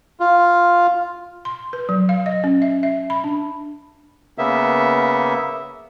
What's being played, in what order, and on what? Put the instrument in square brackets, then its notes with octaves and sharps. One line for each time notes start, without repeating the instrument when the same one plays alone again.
[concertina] F4
[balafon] C6
B4
F#3
F5
D#5
C#4
E5
E5
B5
D4
[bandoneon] C#3 A#3 B3 E5